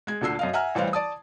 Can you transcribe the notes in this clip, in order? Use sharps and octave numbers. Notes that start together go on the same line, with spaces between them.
G#3 G#6
D2 A#2 D3 E6 C7
F#2 D#5 F5
E5 F#5 G#5 A#5 F6
A1 E3 G3 C5 F5
D5 A5 D#6